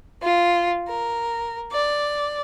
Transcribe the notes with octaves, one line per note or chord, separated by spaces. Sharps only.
F4
A#4
D5